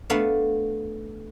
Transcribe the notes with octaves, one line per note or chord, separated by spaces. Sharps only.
A3 B3 D4 F5